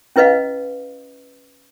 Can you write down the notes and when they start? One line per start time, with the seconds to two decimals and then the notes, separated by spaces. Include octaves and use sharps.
0.16 C#4 E4 B4 D#5 F5